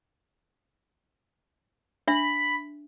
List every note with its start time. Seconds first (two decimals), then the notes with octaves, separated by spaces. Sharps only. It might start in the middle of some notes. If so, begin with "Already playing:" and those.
2.08 D4 E5 B5